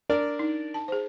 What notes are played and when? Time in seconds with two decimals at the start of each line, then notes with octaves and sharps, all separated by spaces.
0.09 D4 A#4 D5
0.39 D#4
0.74 A5
0.88 G#4 C5